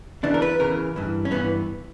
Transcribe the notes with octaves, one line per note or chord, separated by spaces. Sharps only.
E2 C#3 E3 D4
A#4
B4
E2 C#3 E3 A#4
G2 E3
C#4
G2 E3 B3